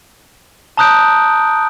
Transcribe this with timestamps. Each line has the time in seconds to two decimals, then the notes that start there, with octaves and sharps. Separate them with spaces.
0.77 A5 A#5 D#6 F#6 G6 D7